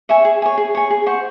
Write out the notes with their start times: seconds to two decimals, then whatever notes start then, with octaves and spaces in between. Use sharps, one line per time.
0.09 C#5 E5 G#5
0.25 G#4
0.42 C#5 G#5
0.58 G#4
0.75 C#5 G#5
0.90 G#4
1.06 C5 F#5 C#6